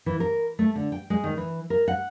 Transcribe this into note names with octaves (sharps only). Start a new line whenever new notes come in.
E3
A#4
A3
D3
G5
G#3
D#3
E3
A#4
F#5